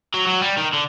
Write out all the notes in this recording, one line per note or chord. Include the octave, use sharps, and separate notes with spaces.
F#3
F#3
G3
D#3
D3